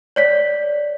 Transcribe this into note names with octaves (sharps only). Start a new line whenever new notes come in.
C#5 D5 B6